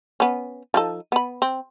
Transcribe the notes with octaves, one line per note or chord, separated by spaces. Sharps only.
B3 C#4
F3 D#4 A4
B3 B5
C4